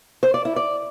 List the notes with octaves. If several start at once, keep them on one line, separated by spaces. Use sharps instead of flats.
C5
D5
E4
D5